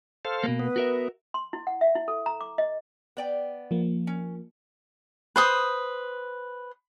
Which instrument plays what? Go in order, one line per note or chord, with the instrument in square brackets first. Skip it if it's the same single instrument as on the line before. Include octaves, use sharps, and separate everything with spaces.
[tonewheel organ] A4 C5 F5
[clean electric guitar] B2 A#3
[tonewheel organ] B3 [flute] B4
[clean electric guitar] F#4 A#4 E5
[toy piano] C6
E4
F#5
E5
E4
A4
A#5
D6
D#5
[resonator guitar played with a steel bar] B3 D5 G5
[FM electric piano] F3 A#3
[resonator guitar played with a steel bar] C#4
[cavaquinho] B4 C5 D#6